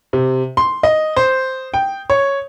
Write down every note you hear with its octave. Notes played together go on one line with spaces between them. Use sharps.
C3
C6
D#5
C5
G5
C#5